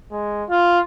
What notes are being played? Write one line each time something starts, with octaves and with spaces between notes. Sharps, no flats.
G#3
F4